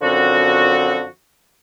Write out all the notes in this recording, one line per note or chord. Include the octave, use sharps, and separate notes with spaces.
F#2 D3 F3 C4 F#4